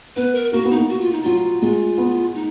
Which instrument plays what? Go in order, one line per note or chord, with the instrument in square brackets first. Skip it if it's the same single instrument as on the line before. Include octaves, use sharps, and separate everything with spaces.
[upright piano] B3 [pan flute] B4
[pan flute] A#4
[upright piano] A#3 [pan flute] F#4
[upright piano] B3
[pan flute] D#4
[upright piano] A#3
[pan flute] F#4
F4
D#4
[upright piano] F#3 [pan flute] F4
[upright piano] G#3 [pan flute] F4
[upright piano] B3
[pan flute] D#4